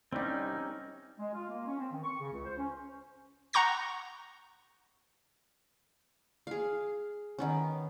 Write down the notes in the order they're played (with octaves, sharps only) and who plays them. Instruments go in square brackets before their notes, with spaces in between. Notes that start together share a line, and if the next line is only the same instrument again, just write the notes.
[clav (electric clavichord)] C2 G3 [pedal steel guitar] C4 C#4 D#4
[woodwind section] G#3
F4
A#3
C#4
C4
D#3
C#6
C#3
C#2
C5
C#4
[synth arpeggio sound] F#5 A#5 C#6 G6 A#6
[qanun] G#4 F5
D#3 B3 C#4